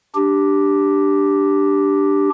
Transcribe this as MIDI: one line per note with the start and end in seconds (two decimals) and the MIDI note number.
0.15 2.30 62
0.15 2.30 67